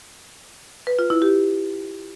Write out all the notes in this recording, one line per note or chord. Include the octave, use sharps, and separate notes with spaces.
B4
F4
E4
G4